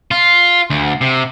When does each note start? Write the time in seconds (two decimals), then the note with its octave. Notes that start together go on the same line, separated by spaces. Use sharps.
0.11 F4
0.70 D2
1.01 C3